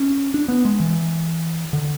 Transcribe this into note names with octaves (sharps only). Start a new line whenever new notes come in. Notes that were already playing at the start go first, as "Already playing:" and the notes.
Already playing: C#4
D4
B3
G#3
E3
D3